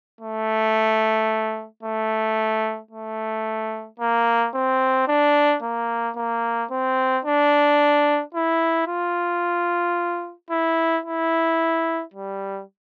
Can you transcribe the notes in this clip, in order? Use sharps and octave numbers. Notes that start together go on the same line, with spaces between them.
A3
A3
A3
A#3
C4
D4
A#3
A#3
C4
D4
E4
F4
E4
E4
G3